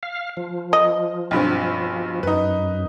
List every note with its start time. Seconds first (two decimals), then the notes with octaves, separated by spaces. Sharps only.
0.03 F5
0.37 F3
0.73 D#5
1.31 B1 G2 C4
2.23 F#2 D#4 B4